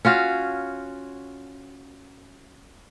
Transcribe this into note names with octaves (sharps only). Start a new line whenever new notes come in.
C#4 F4 F#4 F5